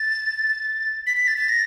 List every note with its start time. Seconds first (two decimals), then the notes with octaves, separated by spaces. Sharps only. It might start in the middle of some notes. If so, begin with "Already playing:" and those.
Already playing: A6
1.07 B6
1.17 B6
1.28 A6
1.38 A6
1.49 A#6